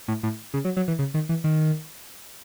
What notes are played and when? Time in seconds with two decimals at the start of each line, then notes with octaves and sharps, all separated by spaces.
0.08 A2
0.23 A2
0.54 C#3
0.65 F#3
0.77 F#3
0.88 E3
0.99 C#3
1.14 D#3
1.29 E3
1.44 D#3